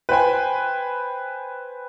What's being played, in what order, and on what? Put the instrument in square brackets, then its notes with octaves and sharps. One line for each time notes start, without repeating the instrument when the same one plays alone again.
[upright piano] B4 C5 G5 G#5